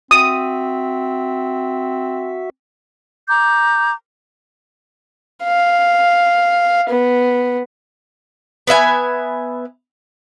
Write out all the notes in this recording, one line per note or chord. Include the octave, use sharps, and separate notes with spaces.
C4 F#4 E5 D#6
A#5 D6 G6
F5
B3
B3 B4 E5 G#5